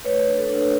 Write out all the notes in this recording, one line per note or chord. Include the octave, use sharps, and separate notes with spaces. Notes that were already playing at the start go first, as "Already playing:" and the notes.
A3 B4 C#5
D4
A4 B4
D4